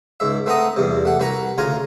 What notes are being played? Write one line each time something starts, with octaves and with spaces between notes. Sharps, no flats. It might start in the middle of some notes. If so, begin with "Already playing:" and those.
C#2 G#2 E5
A3 C4 B4 F#5 A#5 D#6
E2 G2 C3
A3 F#5
C2 F#4 B4 F#5 A#5
D2 C#3 F4 C#5 G#5 A#5